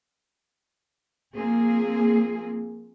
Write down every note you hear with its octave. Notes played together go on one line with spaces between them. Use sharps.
F3 A#3 C4 G#4